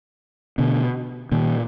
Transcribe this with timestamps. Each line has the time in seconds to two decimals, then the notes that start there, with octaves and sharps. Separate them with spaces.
0.58 B2 D3
1.32 A#2 D#3